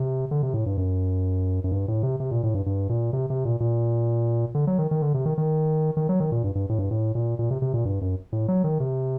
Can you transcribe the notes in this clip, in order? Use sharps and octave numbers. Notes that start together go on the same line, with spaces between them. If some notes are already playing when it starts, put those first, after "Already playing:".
Already playing: C3
D3
C3
A2
G2
F#2
F#2
G2
A2
C3
C3
A#2
A2
G2
G2
A#2
C3
C3
A#2
A#2
D3
F#3
D#3
D#3
D3
C3
D#3
D#3
D#3
F#3
D#3
A#2
G2
G2
A2
G2
A2
A#2
A#2
C3
C3
A#2
G2
F#2
A2
F#3
D#3
C3